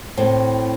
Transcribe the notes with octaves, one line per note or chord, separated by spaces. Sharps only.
A2 C4